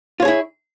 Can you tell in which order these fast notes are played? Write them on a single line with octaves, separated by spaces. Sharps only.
F4 C#5 G#4 E4